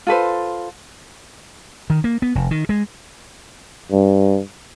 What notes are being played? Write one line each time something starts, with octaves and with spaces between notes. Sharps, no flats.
F4 A4 B4 C5
D#3
A#3
B3
F1
D#3
G#3
G2